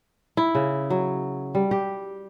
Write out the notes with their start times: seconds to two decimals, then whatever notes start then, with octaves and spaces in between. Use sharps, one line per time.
0.37 E4
0.55 C#3
0.90 F#3
1.55 G3
1.71 G4